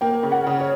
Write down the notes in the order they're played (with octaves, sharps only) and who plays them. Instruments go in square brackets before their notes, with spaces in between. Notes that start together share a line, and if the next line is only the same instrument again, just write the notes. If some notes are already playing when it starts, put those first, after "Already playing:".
[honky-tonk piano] A#3 [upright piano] G5
[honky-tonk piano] C#3
[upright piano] F#5
[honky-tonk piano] C#3
[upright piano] C#5